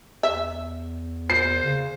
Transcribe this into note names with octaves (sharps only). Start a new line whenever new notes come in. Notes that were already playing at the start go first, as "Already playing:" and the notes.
E2 E5
C5 C7
C#3